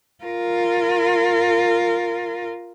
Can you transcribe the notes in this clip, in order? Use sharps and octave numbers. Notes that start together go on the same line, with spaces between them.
F4 A#4